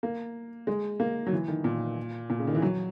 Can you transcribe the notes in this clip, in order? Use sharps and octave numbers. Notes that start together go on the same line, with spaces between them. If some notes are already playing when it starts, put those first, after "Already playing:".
A#3
G#3
A#3
F#3
E3
D#3
A#2
A#2
C#3
D#3
E3
F#3